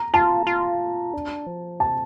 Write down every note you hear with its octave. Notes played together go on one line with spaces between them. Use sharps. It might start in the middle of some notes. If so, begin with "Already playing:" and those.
Already playing: A#5
F4 A5
F4
D4
F3
C3 A5